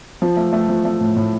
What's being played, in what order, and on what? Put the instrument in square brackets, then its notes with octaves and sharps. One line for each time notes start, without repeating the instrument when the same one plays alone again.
[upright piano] F3
A3
A3
F3
A3
A2
A2